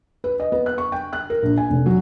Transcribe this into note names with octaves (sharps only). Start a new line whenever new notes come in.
B4
D#5
B3
F#6
C#6
G5
F#6
A#4
A#1
G#5
F1
F#3